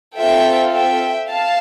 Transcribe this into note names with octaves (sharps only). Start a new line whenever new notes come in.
C4 F4 A4 E5 G5
E5 G5
F5 A5